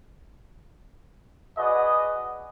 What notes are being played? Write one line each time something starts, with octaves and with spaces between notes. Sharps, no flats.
F#4 G#4 B4 D5 D#5